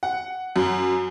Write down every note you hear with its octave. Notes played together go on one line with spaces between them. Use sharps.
F#5
F#2